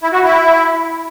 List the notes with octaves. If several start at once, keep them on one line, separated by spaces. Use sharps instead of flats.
E4
F#4
E4